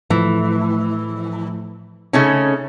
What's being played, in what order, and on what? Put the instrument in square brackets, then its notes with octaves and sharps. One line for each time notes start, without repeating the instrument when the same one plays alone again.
[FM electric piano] A2 F3 A3 [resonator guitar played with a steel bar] E3
[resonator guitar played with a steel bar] C#3 A3 C#4 [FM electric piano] D#4